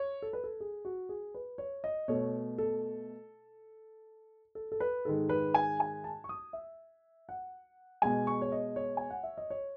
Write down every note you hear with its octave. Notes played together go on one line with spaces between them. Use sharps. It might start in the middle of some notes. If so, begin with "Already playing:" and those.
Already playing: C#5
A4
B4
A4
G#4
F#4
G#4
B4
C#5
D#5
B2 A3 C#5
A4
A4
A4
B4
G#2 D#3 G#3 A4
B4
G#5
G#5
A5
C#6
D#6
E5
F#5
B2 G#3 G#5
C#6
C#5
D#5
C#5
G#5
F#5
E5
D#5
C#5